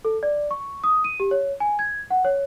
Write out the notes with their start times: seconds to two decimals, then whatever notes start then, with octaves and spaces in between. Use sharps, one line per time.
0.05 A4
0.23 D5
0.51 C#6
0.84 D#6
1.04 D#7
1.20 G4
1.31 C#5
1.60 G#5
1.79 G#6
2.10 F#5
2.25 C#5